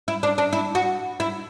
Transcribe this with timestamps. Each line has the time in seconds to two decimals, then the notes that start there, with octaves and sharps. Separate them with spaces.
0.08 E4
0.23 D4
0.38 D4
0.53 E4
0.75 F#4
1.20 E4